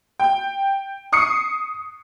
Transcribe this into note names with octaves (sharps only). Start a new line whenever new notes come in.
G5
C#6 D#6 C7 C#7